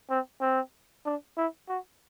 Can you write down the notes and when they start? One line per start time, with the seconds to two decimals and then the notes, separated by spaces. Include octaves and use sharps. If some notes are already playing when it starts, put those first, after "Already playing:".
0.10 C4
0.41 C4
1.06 D4
1.37 E4
1.69 F#4